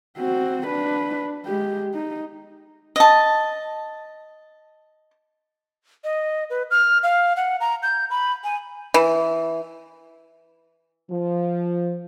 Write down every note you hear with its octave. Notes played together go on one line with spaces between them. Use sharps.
C4 F#4
D4 B4
G#3 G4
D#4
D#5 A5
D#5
B4
F6
F5
F#5
A#5
G6
B5
G#5
E3
F3